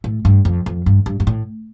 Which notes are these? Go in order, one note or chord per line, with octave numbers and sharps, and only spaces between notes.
A2
G2
F2
F2
G2
G2
G2
A2